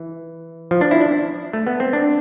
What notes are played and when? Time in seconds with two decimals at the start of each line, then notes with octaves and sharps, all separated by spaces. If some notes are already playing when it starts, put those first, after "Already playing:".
Already playing: E3
0.71 F3
0.81 D4
0.91 E4
1.01 D4
1.53 A3
1.67 B3
1.80 C4
1.93 D4